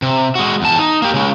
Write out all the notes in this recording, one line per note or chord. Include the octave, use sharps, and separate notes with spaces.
C3
G#3 F#4
E2 A5
D#4
A#3 G4
C#3 G#3